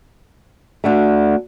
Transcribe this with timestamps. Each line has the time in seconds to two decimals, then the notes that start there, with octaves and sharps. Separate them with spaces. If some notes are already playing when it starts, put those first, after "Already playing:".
0.84 D2 D3 A3